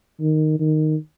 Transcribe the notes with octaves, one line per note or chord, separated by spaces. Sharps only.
D#3
D#3